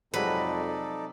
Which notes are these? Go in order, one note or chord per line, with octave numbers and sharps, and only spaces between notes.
F2 C3 F#3 G#3 D#4 A4 B4 D5